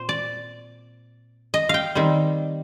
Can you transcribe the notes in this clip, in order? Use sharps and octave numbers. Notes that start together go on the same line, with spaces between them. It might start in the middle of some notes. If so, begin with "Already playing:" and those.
Already playing: A#2 C4 C5
D5
D#5
F5 G5
D#3 G3 C4